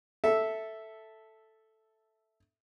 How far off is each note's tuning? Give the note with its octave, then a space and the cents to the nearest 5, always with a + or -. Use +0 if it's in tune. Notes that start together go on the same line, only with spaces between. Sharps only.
A4 +0 E5 -5